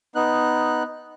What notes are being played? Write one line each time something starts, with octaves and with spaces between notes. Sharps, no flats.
B3 D#4 F#6